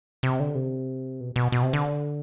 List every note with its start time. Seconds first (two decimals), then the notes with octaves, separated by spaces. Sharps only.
0.23 C3
0.40 D3
0.55 C3
1.20 B2
1.36 B2
1.52 B2
1.63 C3
1.73 D3